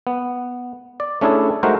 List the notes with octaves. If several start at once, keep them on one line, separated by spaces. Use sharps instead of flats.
B3
D5
A3 C#4 D4 E4 G#4 A4
G#3 A3 D#4 F#4 A#4 C5